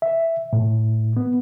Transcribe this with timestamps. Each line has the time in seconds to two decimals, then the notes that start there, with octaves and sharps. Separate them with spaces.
0.02 E5
0.53 A2
1.17 B3